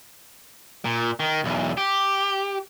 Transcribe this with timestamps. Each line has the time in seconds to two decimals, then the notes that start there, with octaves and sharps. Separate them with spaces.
0.85 A#2
1.20 D#3
1.44 B1 E2
1.77 G4